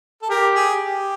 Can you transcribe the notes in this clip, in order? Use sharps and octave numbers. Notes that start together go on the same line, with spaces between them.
A4
G4 A#4
G#4
G4